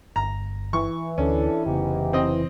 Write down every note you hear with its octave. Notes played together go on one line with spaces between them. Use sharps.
G1 A#5
E3 C#6
D2 C#4 D4 A4
F1 G#2 C#3 B3 D#4 G4
C4 D#5